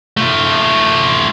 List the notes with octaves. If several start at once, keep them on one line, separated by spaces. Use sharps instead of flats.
A3 F4